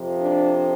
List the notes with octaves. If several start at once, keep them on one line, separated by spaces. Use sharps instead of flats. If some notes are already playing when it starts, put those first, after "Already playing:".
Already playing: F2 C3 F3
D4